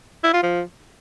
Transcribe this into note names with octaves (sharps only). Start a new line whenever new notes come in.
E4
F4
F3